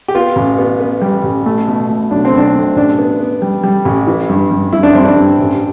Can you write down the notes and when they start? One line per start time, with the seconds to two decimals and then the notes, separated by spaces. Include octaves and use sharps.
0.08 G4
0.14 B3 F4
0.36 A1
0.58 B3
0.80 B3
1.01 G3
1.24 A1
1.46 A3
1.68 B2
1.89 A3
2.11 B1 D4
2.25 C4
2.33 B1 D4
2.54 A3
2.76 A1 D4
2.98 B3
3.20 B3
3.42 G3
3.63 G3
3.85 A1
4.07 E3
4.29 G2
4.51 G2
4.73 G2 E4
4.83 D4
4.93 G2 C4
5.04 D4
5.16 G2
5.39 A1